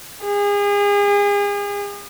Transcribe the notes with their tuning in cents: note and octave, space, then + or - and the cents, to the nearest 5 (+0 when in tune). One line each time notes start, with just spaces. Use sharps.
G#4 -35